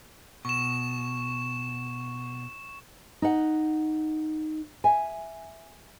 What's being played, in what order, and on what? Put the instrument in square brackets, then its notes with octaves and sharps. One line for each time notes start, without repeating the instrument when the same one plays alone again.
[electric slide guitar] B2 [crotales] C#6 E7
[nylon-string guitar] D#4 F#5
E5 G#5